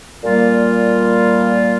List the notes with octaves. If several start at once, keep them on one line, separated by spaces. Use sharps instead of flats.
A#2 G3 A#3 F4